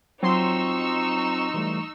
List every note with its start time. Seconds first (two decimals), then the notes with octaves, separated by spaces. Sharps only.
0.23 F#3 C4 D#4 F4 C6 C#6 E6
1.54 E3 G3 A3